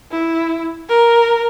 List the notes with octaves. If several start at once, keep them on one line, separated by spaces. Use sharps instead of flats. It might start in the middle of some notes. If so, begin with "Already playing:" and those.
E4
A#4